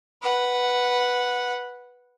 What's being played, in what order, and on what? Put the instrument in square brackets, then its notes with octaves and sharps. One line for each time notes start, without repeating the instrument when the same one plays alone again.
[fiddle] B4 F#5